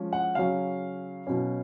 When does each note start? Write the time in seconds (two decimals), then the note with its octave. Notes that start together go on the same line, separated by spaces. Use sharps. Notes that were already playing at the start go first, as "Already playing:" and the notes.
Already playing: F3 G#3 C#4
0.13 F#5
0.35 C#3 F#3 C#4 F5
1.27 B2 F#3 C#4